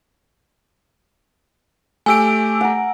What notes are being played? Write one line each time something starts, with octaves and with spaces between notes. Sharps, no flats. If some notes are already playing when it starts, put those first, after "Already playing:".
A3 G4 G#5 E6 D7
A#4 F#5